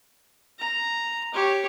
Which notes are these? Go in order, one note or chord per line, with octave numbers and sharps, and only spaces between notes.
A#5
G4 C#5